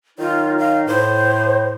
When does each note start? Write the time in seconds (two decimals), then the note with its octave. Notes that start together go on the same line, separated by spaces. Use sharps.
0.19 D#3 F#3 D#4 F4
0.58 F5
0.87 A2 C5